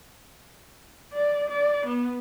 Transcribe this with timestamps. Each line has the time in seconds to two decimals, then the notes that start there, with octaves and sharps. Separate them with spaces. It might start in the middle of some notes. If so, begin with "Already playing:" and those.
1.13 D5
1.48 D5
1.85 B3